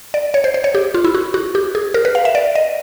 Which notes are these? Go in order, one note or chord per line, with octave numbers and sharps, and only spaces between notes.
D5
C#5
C5
C5
C#5
G4
F4
E4
F#4
F#4
G4
G#4
A#4
B4
F5
E5
D5
D#5